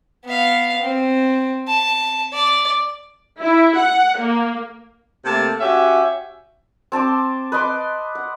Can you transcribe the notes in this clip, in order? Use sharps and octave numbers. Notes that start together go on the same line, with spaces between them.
B3 F5
C4
A5
D5
E4
F#5
A#3
C3 A3 A#3 A5
C#4 F#4 G4 E5 F#5 G#5
C4 A5 C6 D6
B4 D#5 C6 D6
F#5